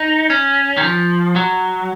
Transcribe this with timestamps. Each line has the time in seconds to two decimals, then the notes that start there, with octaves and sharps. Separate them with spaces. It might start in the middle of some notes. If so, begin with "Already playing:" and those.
Already playing: D#4
0.30 C#4
0.77 D#3
0.83 F3
1.36 F#3